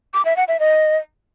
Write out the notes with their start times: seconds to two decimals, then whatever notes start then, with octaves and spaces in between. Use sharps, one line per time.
0.14 D6
0.25 E5
0.37 F#5
0.48 E5
0.60 D#5